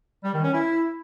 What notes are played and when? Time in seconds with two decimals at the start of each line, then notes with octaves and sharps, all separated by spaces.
0.24 G3
0.34 D#3
0.43 C#4
0.53 E4